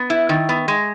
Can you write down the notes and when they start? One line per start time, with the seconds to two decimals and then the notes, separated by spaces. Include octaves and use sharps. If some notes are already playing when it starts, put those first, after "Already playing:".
Already playing: B3
0.10 E4
0.29 D#3
0.49 B3
0.68 G#3